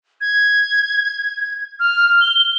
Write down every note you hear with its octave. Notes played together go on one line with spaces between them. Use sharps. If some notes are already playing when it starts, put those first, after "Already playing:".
G#6
F6
G7